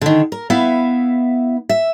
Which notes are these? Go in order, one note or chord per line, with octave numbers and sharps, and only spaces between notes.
D3 D#3
A#4
B3 E4 E5 F5
E5